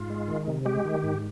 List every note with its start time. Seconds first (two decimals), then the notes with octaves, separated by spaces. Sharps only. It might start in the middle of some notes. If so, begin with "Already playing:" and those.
Already playing: G#2 F4
0.10 G#3
0.28 D#3
0.47 C3
0.65 G#3 G4
0.85 D#3
1.04 G#2